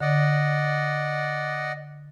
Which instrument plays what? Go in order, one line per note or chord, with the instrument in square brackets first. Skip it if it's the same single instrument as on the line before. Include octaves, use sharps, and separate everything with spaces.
[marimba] D3 [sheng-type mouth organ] D5 D#5 F#5